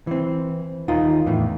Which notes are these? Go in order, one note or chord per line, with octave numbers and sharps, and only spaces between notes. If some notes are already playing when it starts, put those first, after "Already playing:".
E3 C4
D#2 D#4 F4 A#4
E2 A2 E3